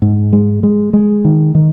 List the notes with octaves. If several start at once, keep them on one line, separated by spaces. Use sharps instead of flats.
G#2
G#3
G#3
G#3
D#3
D#3